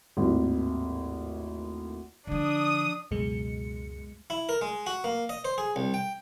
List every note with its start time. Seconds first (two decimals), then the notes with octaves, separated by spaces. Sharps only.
0.17 G#1 D#2 A2
2.27 D3 F3 D4 D#6
3.11 C#2 F#2 B2 G#3 C#7
4.30 E4
4.49 A#4
4.61 G#3
4.87 F#4
5.04 A#3
5.29 D#5
5.45 C5
5.58 G#4
5.76 C2
5.94 G5